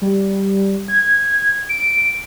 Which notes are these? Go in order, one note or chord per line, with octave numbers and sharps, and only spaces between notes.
G3
G#6
D7